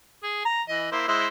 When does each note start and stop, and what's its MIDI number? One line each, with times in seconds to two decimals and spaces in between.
0.24 0.43 68
0.45 0.62 82
0.68 0.88 52
0.68 0.88 75
0.92 1.05 58
0.92 1.05 64
0.92 1.05 72
1.08 1.27 56
1.08 1.27 64
1.08 1.27 72